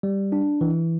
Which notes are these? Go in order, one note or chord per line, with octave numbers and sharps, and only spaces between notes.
G3
D4
E3